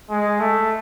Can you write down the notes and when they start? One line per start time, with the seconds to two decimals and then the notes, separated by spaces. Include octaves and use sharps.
0.10 G#3
0.40 A3